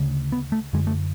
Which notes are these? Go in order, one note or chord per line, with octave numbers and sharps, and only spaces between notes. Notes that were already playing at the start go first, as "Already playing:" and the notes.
Already playing: D2 C#3
B3
A3
F#2 D3 G#3
A3